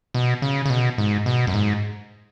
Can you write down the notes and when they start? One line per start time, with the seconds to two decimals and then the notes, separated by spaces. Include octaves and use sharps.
0.14 B2
0.42 C#3
0.66 C#3
0.70 B2
0.98 G#2
1.26 B2
1.47 F#2
1.54 G#2